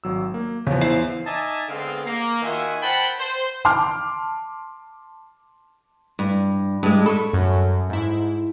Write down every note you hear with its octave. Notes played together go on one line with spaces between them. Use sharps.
G#1 F#3 E6
A#3
E2 C#3 F3
E4 C5 F5
D#4 D5 E5 G#5 A5
D3 G#3 B3 C4 G#4 F5
A#3
D#3 F4 F#4 E5 G#5
A#4 C5 F#5 G5 A5 B5
C5
A5 C6 D6 F6
G2
G2 G#3
A4 B5 C#6
F#2
G#2 E4